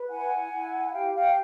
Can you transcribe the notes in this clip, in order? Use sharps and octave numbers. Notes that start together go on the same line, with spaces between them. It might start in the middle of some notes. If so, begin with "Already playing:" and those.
Already playing: B4
E4 F#5 G#5
E4
G4 F5 G5
F5 G5